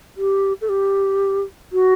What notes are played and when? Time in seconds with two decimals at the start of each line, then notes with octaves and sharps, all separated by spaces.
0.17 G4
0.61 A4
0.69 G4
1.72 F#4